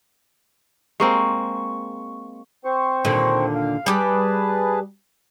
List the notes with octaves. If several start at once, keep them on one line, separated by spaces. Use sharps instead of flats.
G#3 A#3 C4 C#6
C4 C5 C#6
D#2 A#2 D3
F5
G3 G4 G#4 B4 A5